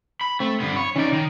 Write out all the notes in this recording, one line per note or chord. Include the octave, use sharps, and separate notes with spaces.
B5
A3 C4
G2 B3
C#5 B5
E3 C#4 D#4 D5
D#3